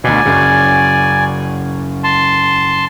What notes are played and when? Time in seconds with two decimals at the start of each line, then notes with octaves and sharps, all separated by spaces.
0.04 D2 B2 D5 G#5
0.26 F#2 C#3
2.04 A5 C6